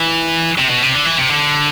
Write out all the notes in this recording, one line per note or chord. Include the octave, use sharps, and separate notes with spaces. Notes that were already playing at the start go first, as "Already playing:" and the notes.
Already playing: E3
C3
B2
C3
D3
E3
C3
D3